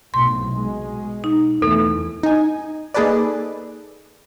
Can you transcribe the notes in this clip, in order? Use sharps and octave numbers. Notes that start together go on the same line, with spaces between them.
B1 A2 C3 C6
B2 G#3
D#4
E2 E3 A3 A4
D#4 G#5
A#3 D#4 G#4 A4 B4 D5